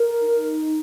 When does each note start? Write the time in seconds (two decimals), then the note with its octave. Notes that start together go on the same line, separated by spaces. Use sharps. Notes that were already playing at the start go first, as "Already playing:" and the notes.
Already playing: A#4
0.20 D#4